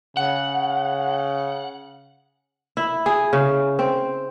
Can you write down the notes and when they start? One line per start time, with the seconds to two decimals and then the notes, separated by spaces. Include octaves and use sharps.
0.17 C#3 F#5
2.77 E4
3.06 G#4
3.33 C#3
3.79 C4